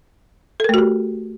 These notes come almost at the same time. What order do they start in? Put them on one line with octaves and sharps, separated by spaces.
A4 A#4 A3 F#4 G4